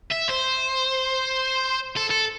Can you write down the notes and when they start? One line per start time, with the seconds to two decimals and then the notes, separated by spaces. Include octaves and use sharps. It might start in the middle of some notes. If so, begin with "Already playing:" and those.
0.12 E5
0.30 C5
1.97 A4
2.11 A4